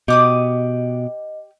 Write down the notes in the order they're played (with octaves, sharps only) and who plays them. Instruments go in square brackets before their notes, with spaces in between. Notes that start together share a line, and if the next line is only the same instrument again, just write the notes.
[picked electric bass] B2 [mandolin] G4 D6 D#6 [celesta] D#5